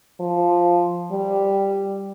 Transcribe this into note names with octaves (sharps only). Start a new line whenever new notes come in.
F3
G3